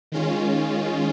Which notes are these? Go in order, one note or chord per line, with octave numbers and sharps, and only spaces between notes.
D#3 G#3 C#4 F4